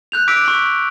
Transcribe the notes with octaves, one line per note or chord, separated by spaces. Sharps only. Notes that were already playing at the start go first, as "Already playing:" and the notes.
F#6 G6 F7
D6 E6 B6 D7
C#6 B6 F#7